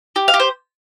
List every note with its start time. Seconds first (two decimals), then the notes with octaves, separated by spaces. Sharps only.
0.16 G4
0.28 F5
0.34 G4
0.40 C5